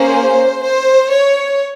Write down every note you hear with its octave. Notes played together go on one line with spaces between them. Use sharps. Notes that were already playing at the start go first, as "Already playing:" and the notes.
Already playing: A#3 C#4 G#4 C5
C5
C#5